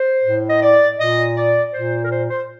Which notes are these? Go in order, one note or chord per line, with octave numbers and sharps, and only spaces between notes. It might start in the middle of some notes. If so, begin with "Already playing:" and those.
Already playing: C5
A2
D#5
D5
A#2 D#5
D5
A#2 C5
A#4
C5
C5